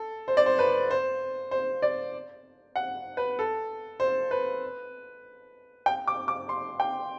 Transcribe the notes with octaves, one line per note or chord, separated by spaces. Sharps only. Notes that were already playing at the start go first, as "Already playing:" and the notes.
Already playing: A4
C5
D5
C5
B4
C5
C5
D5
F#5
B4
A4
C5
B4
G5
D6
D6
C6
G5